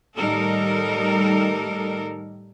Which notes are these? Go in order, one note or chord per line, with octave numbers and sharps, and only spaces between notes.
A2 D#3 G3 D#4 A4 A#4